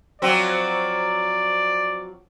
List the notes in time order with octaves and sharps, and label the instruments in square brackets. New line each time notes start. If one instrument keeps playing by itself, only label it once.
[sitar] F3 F#3 C4 [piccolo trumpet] D5